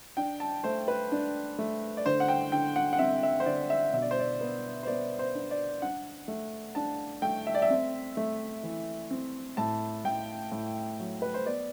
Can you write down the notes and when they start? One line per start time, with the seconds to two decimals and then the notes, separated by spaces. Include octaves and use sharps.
0.17 D4 G5
0.40 A5
0.64 A3 C5
0.88 B4
1.12 D4
1.59 A3
1.97 D5
2.06 D3 C5
2.20 F#5
2.28 G5
2.52 D3 G5
2.76 F#5
2.93 F#5
2.99 C4 E5
3.23 E5
3.40 C5
3.46 D3 D5
3.70 E5
3.93 B2 E5
4.02 D5
4.11 C5
4.19 D5
4.41 B3
4.83 C5
4.87 B3 D5
5.19 C5
5.35 D4
5.51 D5
5.82 D4 F#5
6.28 A3
6.75 D4 A5
7.22 A3 G5
7.47 E5
7.54 D5
7.62 E5
7.70 C4
8.17 A3
8.63 E3
9.11 C4
9.57 A2 A5
10.05 A2 G5
10.52 A2
10.99 F#3
11.22 B4
11.34 C5
11.46 B3 D5